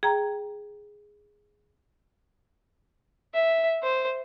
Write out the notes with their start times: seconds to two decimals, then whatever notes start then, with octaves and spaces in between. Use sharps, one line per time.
0.03 G#4 G5 A#5
3.34 E5
3.82 C5